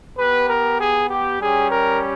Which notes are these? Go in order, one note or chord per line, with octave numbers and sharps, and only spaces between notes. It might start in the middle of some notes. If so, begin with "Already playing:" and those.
B3 G4 B4
A#4
G#4
G4
G3 C#4 G4 G#4
A#4